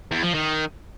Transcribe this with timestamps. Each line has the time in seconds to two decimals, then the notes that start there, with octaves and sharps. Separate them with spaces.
0.11 E2
0.23 F3
0.34 D#3